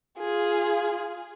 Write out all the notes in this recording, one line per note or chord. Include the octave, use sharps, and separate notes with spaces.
F4 G#4